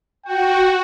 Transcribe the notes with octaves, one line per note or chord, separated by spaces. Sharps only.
F#4 G5